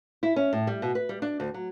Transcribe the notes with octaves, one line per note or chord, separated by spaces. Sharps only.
E4
C#4
A2
G3
B2
B4
G3
D4
D2
F#3